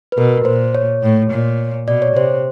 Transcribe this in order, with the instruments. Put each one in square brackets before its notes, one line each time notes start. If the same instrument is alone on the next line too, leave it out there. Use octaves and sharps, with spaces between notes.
[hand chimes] B4
[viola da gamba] B2 [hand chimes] A#4
[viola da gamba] A#2 [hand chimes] C5
[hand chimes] C#5
[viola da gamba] A2
A#2
[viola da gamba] B2 [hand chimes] D5
[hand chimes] C#5
[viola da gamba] C3 [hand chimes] C5